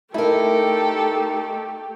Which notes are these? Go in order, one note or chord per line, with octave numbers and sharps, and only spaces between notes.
A3 D#4 E4 G4 A4 A#4